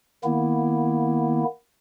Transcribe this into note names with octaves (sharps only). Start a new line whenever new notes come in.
D#3 A#3 B3 E4